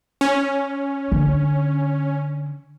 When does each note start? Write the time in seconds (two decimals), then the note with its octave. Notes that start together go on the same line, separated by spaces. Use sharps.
0.21 C#4
1.12 D3